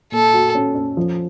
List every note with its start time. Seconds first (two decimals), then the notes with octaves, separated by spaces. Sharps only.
0.12 A#2 A4
0.34 F#4
0.55 C#4
0.75 C#4
0.97 F3